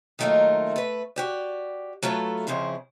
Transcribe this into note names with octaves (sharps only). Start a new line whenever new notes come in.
D#3 F#3 A3 A#3 D#4 F4
A3 B4
F#4 G4 D5
F#3 A3 F4 A4 B4
F2 C#3 F3 E4 F4